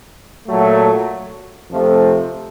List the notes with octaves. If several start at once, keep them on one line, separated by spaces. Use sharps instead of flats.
A#2 F#3 A3
F2 C3 F3 A3